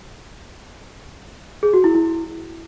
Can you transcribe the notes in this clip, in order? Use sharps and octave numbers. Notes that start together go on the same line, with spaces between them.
G#4
F#4
E4
E4